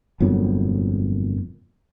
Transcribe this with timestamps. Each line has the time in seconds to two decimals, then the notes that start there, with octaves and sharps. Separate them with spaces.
0.20 G1 F2 A#2 F#3